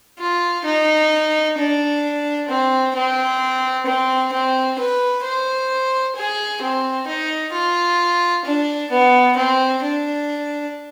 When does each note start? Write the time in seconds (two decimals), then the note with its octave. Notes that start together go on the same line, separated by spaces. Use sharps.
0.20 F4
0.65 D#4
1.58 D4
2.49 C4
2.95 C4
3.86 C4
4.33 C4
4.79 B4
5.24 C5
6.16 G#4
6.62 C4
7.07 D#4
7.53 F4
8.45 D4
8.91 B3
9.37 C4
9.83 D4